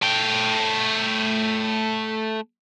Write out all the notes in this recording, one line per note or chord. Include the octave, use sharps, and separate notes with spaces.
A3 G5